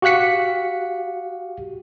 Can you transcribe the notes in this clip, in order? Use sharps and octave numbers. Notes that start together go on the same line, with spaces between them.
F#4 G4 F5 F#6 B6 C#7